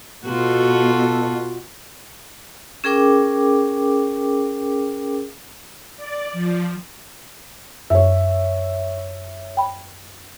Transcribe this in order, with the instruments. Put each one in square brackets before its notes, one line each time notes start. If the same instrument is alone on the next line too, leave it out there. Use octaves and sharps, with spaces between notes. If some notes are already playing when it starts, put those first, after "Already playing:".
[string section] B2 [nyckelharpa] F4 F#4 [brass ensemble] A4
[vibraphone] C#4 G#4 A#4 G5 D6
[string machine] D5
F3
[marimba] F#2 [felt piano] C#5 E5
[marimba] G5 B5